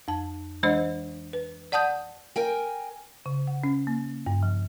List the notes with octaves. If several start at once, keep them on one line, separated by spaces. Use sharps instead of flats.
F2 A5
E3 G#3 D4 C5 D#5
B4
D5 F#5 A5 D#6 G6
A#4 G5 G#5
C#3
F#5
C#4
A#3
G2
F3